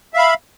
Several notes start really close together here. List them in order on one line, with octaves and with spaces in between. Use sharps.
E5 F5 B5